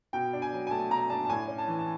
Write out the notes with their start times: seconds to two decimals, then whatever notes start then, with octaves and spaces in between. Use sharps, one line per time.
0.13 B2 G5
0.33 D4
0.42 G#5
0.53 F#3
0.67 G#5
0.71 A3 A5
0.90 B2 A#5
1.10 D4 A5
1.25 A5
1.29 A2 G#5
1.48 C#4
1.58 A5
1.68 E3
1.79 A5